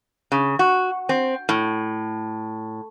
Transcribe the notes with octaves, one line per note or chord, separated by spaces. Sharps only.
C#3
F#4
C4
A2